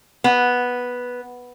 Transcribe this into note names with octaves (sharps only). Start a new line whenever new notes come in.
B3